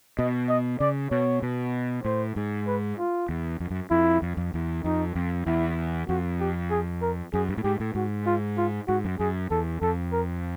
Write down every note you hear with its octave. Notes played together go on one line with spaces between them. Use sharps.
B2 D#5
D#5
C#3 D5
B2 C#5
B2
A2 C5
G#2
B4
F4
E2
F2
F#2
F2 E4
F2
F2
E2
F2 D#4
F2
E2 E4
F2 F#4
G4
G#4
A#4
F#2 G#4
G2
A2
G#2 G4
A2
G#2 F#4
F4
F4
G#2 F#4
F#2
F#2 G#4
E2 A4
F2 A4
A#4